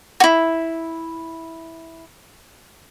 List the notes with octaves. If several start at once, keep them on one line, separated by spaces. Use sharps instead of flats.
E4 F#4